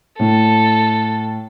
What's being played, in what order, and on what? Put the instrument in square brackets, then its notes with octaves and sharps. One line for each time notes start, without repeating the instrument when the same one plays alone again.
[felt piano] A2 [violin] A4